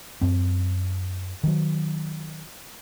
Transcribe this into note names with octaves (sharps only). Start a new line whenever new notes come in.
F#2 C4
D#3 F#3